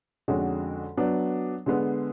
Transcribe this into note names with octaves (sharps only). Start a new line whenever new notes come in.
F2 D3 G#3 C#4 F#4
F#3 B3 D4
D3 G#3 B3